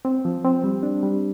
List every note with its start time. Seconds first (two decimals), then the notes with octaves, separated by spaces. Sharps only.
0.05 C4
0.25 F3
0.44 C4
0.64 G3
0.83 D4
1.03 G3